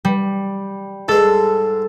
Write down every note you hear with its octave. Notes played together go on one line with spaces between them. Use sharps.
G3
G#2 G#3 A4